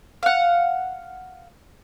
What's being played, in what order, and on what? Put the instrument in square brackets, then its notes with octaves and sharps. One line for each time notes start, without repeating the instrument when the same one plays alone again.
[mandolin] F5 F#5